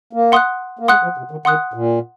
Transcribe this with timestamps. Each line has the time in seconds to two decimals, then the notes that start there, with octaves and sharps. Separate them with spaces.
0.13 A#3
0.32 F#5 C6 D#6 F#6
0.79 A#3
0.88 G#3 F#5 C6 D#6 F#6
1.03 F3
1.17 C3
1.31 D#3
1.45 D#3 F#5 C6 D#6 F#6
1.74 A#2